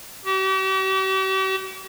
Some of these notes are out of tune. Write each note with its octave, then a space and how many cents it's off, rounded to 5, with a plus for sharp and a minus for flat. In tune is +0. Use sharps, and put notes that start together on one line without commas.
G4 -45